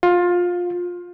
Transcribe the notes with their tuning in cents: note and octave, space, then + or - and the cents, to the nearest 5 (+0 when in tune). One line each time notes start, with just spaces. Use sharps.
F4 +20